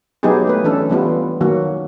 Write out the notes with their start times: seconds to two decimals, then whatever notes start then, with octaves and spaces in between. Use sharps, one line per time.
0.23 F#3 B3 D#4 E4 G4 G#4
0.47 A3 B4
0.64 E3 C#4 D4 A4
0.89 E3 G3 B3 F4
1.41 D#3 F#3 A#3 F#4